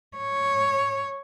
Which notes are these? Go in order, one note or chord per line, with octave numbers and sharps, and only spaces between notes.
C#5